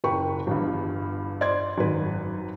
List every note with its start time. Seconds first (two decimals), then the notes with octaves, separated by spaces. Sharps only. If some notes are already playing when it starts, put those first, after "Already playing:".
0.04 F#1 A#4 B4 G5 B5 C#6
0.47 G1 E2 G2
1.41 C5 D5 D#5 C6 G#6
1.78 G#1 F#2 B4